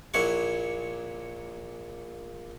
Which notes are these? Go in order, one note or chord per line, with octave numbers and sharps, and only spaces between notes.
A#1 A#2 E4 C#5 F#5 C#6